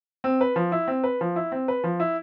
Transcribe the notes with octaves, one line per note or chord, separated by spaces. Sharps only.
C4
B4
F3
E4
C4
B4
F3
E4
C4
B4
F3
E4